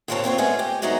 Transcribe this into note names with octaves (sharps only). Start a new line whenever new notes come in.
D#2 A#2 A#3 C4 C#5 A5
D3 C4 F4 C#5
G#3 A3 B3 C#4 G#4
G4
F#3 G#3 A3 B3 D#4